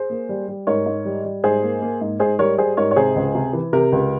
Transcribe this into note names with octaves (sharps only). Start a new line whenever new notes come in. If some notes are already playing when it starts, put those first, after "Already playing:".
Already playing: G#4 C5
A#3
G3
G3
G#2 A#4 C#5
G#2
G3
G3
G#2 G#4 C5
A#3
A#3
G#2
G#2 G#4 C5
G3 A#4 C#5
G3 G#4 C5
G#2 A#4 C#5
C#5
C3 G#4 C5
C#2
C3
E3
C3 G4 A#4
C#2